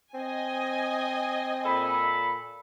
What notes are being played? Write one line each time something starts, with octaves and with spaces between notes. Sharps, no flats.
C4 D#5 G#5
A#2 A4 B5